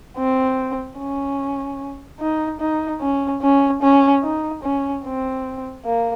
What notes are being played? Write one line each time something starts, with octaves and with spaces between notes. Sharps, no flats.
C4
C#4
D#4
D#4
C#4
C#4
C#4
D#4
C#4
C4
A#3